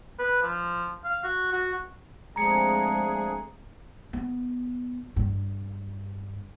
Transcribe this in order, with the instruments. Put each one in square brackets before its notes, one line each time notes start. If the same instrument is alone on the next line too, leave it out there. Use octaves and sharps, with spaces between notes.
[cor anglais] B4
F3
F5
F#4
F#4
[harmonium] F3 A3 D4 [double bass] G#3 C4 [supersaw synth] G#4 [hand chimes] A#5 C#7
[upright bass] B3
G2